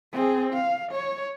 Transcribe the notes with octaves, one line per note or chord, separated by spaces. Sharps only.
C4 G#4
F5
C#5